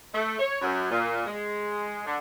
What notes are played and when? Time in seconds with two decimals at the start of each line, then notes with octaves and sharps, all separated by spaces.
0.12 A3
0.39 C#5
0.62 F#2
0.91 A#2
1.26 G#3
2.06 D3